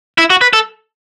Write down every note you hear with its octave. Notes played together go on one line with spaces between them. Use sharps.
E4
F#4
B4
A4